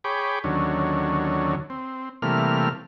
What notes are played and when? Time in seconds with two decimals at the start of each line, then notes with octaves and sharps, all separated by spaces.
0.04 G#4 C#5 G5 B5 D6
0.44 D#2 D3 F#3 C#4
1.70 C4
2.22 C3 E3 G3 A3 A#3 F6